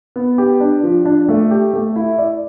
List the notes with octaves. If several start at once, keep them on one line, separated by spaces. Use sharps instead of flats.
B3
G4
D4
F3
D4
A3
G4
A3
E4
D5